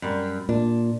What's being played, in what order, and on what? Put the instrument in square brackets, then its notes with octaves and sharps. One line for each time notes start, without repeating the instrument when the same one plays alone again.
[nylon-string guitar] F#2 G3
[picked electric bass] A#2 [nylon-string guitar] D4